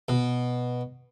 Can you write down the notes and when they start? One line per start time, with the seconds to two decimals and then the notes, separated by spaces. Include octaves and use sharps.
0.09 B2